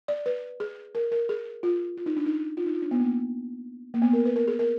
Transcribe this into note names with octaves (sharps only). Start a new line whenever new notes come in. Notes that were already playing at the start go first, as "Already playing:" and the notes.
D5
B4
G#4
A#4
A#4
G#4
F4
F4
D#4
D4
D#4
F4
D#4
F4
D4
B3
A#3
A#3
B3
A#4
B4
A#4
G#4
A#4